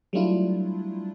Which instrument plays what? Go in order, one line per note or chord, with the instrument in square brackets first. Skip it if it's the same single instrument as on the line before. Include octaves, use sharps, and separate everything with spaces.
[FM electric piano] F#3 G3 A3 D4 E4 F4